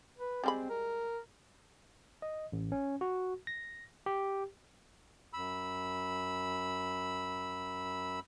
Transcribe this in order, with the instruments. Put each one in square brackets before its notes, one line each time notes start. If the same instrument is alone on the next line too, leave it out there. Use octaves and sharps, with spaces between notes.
[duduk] B4
[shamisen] G3 G#3 B5 [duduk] C4
[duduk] A#4
[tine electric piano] D#5
A1
C#4
F#4
A#6
G4
[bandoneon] F#2 B5 E6